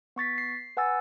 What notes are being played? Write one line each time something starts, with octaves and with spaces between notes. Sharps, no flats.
B3 C#6 A6 B6
C7
B4 F#5 G#5 E6 A6